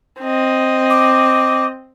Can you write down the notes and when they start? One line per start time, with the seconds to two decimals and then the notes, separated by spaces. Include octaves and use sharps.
0.21 C4 D#5
0.90 D6